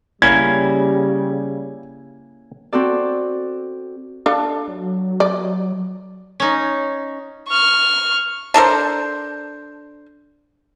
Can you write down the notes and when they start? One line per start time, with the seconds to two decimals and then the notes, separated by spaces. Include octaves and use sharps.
0.22 C#3 G3 A#3 C#4 E4 G#6
2.73 C4 F#4 A4 D5
4.26 D4 A4 F5
4.68 F#3
5.20 D5
6.40 C#4 D#4
7.48 C#6 F6
8.54 D4 A4 A#4 C5